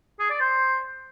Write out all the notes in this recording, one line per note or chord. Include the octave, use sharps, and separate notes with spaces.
G#4
D5
C5